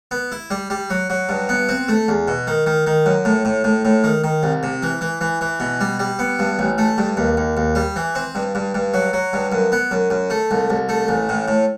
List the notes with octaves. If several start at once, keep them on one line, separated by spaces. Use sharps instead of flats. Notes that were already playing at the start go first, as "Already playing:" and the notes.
B3
E4
G3
G3
F#3
F#3
G2
B3
C4
A3
E2
B2
D#3
D#3
D#3
F#2
A2
A2
A2
A2
D#3
D#3
C2
C3
E3
E3
E3
E3
B2
G3
G3
B3
G2
A1
A3
G2
D#2
D#2
D#2
G3
E3
C4
G2
G2
G2
F#3
F#3
G2
F#2
B3
F#2
F#2
A3
C2
C2
A3
A1
A2
A2